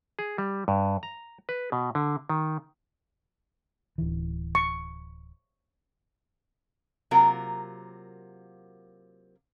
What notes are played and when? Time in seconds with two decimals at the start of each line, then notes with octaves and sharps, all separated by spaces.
0.19 G#4
0.38 G3
0.68 G2
1.03 A#5
1.49 B4
1.72 B2
1.95 D3
2.30 D#3
3.98 D1 E3
4.55 C#6
7.11 C3 F#3 A#3 F4 A#4